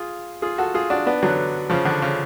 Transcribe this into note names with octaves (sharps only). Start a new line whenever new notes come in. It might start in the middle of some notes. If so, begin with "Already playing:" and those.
Already playing: F4 G#4
F4 G#4
F#4 A4
F4 G#4
D4 F#4
B3 D4
D3 F#3
C#3 F3
D3
C#3